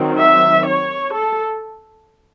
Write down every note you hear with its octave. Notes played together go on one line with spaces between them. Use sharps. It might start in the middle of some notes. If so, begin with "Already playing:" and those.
Already playing: D#3 F#3 C4
E5
C#5
A4